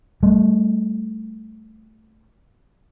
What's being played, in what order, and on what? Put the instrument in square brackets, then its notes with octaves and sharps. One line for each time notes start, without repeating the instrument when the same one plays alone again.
[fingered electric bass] G3 A3